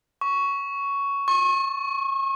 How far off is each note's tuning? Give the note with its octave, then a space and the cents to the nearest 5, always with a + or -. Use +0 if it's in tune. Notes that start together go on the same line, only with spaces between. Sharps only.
C#6 +10
C#6 -35